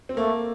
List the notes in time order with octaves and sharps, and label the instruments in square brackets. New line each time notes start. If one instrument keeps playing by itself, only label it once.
[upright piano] C4
[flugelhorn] A3 [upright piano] A#3